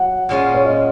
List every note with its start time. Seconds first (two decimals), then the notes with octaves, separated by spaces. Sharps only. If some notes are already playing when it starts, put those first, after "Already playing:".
Already playing: F#3 F#5
0.29 A#2 G#3 C#4 F4
0.54 C#5
0.65 D#5